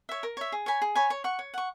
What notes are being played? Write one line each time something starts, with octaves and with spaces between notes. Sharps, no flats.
C#5 E5
A#4
C#5 E5
G#4
C#5 G#5 B5
G#4
C#5 G#5 B5
C#5
F#5 C#6
C#5
F#5 C#6